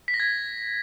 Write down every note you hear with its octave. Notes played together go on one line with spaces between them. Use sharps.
B6
A#6
G#6